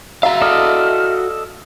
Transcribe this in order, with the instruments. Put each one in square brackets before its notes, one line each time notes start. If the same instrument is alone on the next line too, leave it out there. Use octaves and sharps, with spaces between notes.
[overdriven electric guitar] F#4 F5 [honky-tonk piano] E5 A#5
[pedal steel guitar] A4 D5 D#5 [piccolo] F6